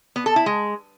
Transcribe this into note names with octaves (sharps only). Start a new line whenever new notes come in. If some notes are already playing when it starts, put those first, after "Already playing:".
B3
A4
E4
G#3